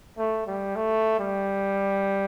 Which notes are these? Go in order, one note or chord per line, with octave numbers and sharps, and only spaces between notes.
A3
G3
A3
G3